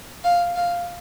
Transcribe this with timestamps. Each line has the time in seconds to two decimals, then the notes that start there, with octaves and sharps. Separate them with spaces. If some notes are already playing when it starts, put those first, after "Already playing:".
0.24 F5
0.56 F5